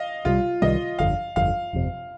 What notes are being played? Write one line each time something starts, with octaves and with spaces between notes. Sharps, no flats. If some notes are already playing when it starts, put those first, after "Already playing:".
Already playing: D#5 F5
C2 C3 D#3 G3 F4
C2 C3 D#3 G3 D#5
G1 F2 D3 F5
G1 F2 D3 F5
G1 F2 C3